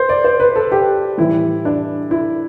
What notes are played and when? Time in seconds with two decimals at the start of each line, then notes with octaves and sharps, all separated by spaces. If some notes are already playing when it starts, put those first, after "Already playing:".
Already playing: C5
0.09 D5
0.24 C5
0.40 B4
0.56 A4
0.72 G4
1.18 A2 E3 G3 E4
1.65 D4
2.11 E4